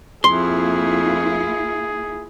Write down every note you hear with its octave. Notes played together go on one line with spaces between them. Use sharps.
F2 A#3 E4 F4 G#4 C6